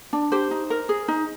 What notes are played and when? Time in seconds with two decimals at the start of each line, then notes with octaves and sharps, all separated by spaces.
0.13 D4
0.32 G4 C5
0.51 D#4
0.70 A#4
0.89 G#4
1.08 D#4